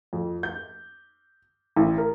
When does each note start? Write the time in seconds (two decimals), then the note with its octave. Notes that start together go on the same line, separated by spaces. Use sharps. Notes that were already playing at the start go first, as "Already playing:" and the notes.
0.13 F2
0.43 G6
1.76 A1
1.98 A#4